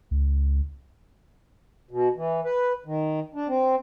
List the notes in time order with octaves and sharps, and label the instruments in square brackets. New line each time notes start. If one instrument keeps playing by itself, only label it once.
[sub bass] C#2
[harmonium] B2
E3
B4
D#3
D4
C4